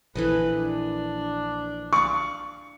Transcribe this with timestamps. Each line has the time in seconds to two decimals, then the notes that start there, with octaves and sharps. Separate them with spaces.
0.15 A#1 E3 A4 B4 D#5
0.59 D4
1.93 D5 F5 C#6